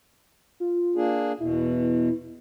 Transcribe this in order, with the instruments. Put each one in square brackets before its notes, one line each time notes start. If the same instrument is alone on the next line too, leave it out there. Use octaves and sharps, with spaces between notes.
[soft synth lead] F4
[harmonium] A#3 D4 G#4
[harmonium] E2 B2 [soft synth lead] E4